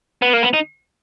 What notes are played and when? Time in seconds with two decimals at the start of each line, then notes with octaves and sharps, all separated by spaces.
0.22 B3
0.33 A#3
0.43 B3
0.54 D#4